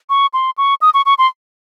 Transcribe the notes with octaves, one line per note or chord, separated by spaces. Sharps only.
C#6
C6
C#6
D#6
C#6
C#6
C6